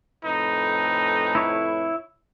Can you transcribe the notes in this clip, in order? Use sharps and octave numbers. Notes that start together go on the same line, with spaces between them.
F2 A2 D#4 B4
E4 C#5